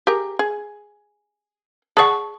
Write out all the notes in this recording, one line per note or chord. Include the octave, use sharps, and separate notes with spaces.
G4 G#4 A#4
G#4
G#4 D5 F#5 A5 C#6